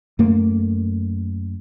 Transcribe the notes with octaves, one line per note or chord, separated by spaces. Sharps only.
F#2 A3 A#3